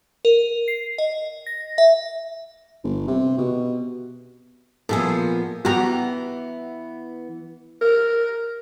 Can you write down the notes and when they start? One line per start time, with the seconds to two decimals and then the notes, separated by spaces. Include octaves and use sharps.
0.25 A#4
0.68 C7
0.98 D#5
1.46 A#6
1.78 E5
2.84 G1
3.07 C3
3.38 B2
4.89 A#2 F3 B3 G#4 A4
5.65 E3 B3 F#4 G4 A#5
7.81 A#4